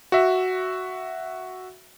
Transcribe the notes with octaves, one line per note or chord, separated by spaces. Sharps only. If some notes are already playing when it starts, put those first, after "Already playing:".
F#4 E5